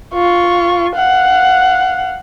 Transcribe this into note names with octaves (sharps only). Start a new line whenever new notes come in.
F4 C#6
F5 F#5